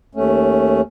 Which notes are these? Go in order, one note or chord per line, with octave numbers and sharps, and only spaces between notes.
D#2 A3 C#4